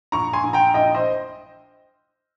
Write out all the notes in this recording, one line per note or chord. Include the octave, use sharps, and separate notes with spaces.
A#1 A#5 C#6
G#5 C6
A#1
G5 A#5
A#1 D#5 G5
C5 D#5